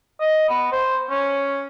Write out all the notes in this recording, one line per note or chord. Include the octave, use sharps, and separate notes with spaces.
D#5
B3
C5
C#4